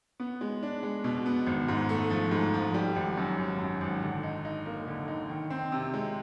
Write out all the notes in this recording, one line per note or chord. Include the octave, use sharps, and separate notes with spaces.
B3
G#3
D4
G#3
B2
B3
G#1
G#2
A3
F3
G#2
F3
G3
G#1
F#2
G#1
F#2
G#1
D3
D#4
D#4
A#3
D3
D#4
D#3
C4
C3
G#3